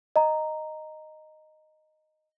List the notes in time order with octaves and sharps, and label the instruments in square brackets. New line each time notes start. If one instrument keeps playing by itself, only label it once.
[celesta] D#5 A#5